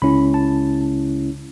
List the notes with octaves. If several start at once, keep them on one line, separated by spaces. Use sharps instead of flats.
C#2 C#3 G#3 C#4 E4 B5
A5